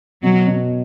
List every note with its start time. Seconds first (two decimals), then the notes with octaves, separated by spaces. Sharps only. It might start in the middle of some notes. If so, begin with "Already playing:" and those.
0.23 B2 F#3
0.47 B2